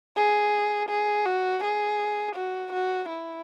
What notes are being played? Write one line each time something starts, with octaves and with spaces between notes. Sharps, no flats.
G#4
G#4
F#4
G#4
F#4
F#4
E4